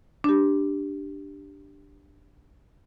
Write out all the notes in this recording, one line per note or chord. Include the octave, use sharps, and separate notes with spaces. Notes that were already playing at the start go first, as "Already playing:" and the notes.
D4 G4